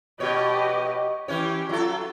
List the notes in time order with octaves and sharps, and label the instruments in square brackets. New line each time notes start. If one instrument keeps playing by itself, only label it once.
[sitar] B2 C#5 [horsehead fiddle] G4 D#5
[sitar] E3 C#4 C#5 [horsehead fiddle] G4
[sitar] F#3 A4 [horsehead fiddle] F4